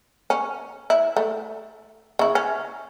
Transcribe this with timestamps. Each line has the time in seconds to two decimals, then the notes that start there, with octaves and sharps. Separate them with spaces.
0.30 C#4
0.90 E4
1.17 A3
2.19 C#3 E4
2.35 C#4